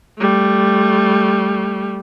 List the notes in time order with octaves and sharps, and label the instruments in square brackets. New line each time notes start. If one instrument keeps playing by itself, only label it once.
[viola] G3 A3